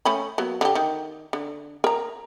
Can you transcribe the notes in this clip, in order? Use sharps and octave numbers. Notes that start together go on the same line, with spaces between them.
A3 C#4 B5
F#3 A#3 B3
D3 G4
D#3
D3
A#4 A#5